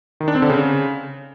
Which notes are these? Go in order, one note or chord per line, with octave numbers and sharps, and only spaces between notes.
D#3
D4
C4
D3
C#3